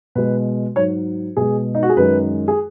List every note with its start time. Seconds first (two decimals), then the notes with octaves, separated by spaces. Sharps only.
0.15 B2 G#3 B4
0.76 G#2 F#3 C#5
1.37 B2 G#3 G#4
1.75 D#4
1.83 F#4
1.89 G#4
1.97 F#2 D#3 G#3 B4
2.48 G#4